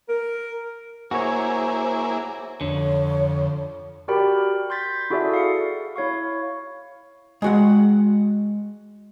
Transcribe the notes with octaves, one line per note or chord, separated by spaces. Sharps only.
A#4
A#3 E4 F#4 G#4 C5 C#5
F2 D3 C#5
F#4 G4 A#4 D5 G5 B5
C6 G6 A6 B6
E4 F#4 G#4 A4 D5 E5
F5 C#7
E4 C#5 F5 C#6
G#3 F#4 F#5